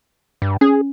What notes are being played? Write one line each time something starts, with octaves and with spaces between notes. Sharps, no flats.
G2
C#4 G#4